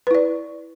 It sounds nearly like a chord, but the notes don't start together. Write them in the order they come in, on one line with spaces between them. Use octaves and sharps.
B4 E4 D5